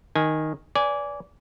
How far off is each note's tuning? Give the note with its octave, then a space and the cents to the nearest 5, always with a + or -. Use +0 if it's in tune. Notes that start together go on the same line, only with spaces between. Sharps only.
D#3 +0 G#5 +0
B4 +20 D5 -25 G#5 +0